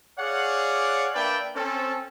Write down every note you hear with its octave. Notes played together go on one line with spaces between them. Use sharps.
G#4 C#5 D5 F5 F#5
A#3 D4 B4 D5 E5 G5
C4 C#4 A4